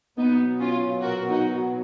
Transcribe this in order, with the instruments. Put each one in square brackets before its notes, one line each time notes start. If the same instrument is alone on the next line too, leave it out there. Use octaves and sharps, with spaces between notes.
[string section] B2 F#3 B3 D#4
C#4 F4
F#4 A#4
D#4 F#4